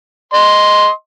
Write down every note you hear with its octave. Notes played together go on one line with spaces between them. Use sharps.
D#5 C6